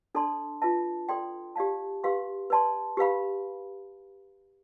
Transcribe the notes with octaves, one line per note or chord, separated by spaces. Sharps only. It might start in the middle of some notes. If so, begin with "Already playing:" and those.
D4 A4 D5 A5 C6
F4 B4 E5 A5
A4 D5 G5 C6
G4 D5 F5 A5
G4 B4 F5 C6
B4 D5 A5 C6
G4 B4 F5 B5